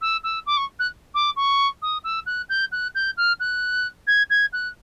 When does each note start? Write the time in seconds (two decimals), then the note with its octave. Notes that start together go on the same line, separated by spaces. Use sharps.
0.01 E6
0.23 E6
0.46 D6
0.57 C#6
0.79 F#6
1.14 D6
1.36 C#6
1.82 D#6
2.04 E6
2.26 F#6
2.49 G6
2.72 F#6
2.95 G6
3.17 F6
3.40 F#6
4.07 G#6
4.30 G#6
4.53 F#6